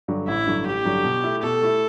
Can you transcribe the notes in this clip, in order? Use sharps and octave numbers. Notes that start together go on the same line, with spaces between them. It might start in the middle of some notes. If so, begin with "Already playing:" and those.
G2 D3 F#3
A1 E4
G2 D3 F#3
A1 G4
G2 D3 F#3
B2
A3 E4
B2 A4
A3 E4